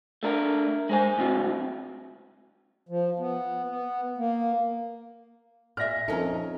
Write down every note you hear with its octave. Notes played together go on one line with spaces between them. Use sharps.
A3 D4 A#4
G#3 C5 G#5
C#2 F#2 A2 C4 F#4
F3
B3
B3
A#3
A#2 D5 E5 F6 A#6
F2 C#4 D#4 A4 A#4 A#5